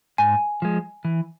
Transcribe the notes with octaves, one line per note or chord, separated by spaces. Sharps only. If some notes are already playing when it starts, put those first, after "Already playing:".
G#2 G#5
F3 G#3
E3